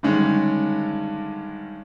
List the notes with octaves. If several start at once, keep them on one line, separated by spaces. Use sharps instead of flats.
G2 D3 D#3 G#3 C#4